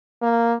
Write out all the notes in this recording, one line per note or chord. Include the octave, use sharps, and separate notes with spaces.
A#3